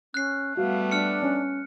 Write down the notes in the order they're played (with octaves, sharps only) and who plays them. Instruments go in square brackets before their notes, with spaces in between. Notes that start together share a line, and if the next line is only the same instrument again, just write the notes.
[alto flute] C#4 [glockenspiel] F#6 C7
[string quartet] G3 A3 B3 [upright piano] F#4 [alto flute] F5
[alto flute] D4 [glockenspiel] F6 C#7
[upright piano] C#4